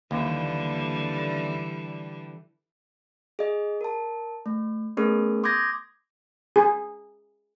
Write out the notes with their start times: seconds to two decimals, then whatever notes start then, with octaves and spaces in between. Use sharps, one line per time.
0.11 D#2 D3 E3 G3
3.39 G#4 D#5
3.81 A#4 A5
4.46 A3
4.97 A3 B3 C#4 G#4 A#4
5.44 C6 D6 D#6 G6 G#6 A#6
6.56 G#4